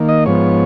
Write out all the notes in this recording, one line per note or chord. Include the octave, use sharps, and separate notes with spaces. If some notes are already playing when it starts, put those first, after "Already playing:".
Already playing: D#3 A#3
D#5
G#2 F3 B3 C#5